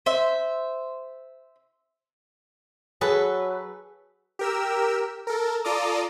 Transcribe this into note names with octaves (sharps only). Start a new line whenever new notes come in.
C5 E5
F#3 G#4 A4 B4
G4 A#4 E6
A4 A#4
F4 A4 D5 A#5 D6 D#6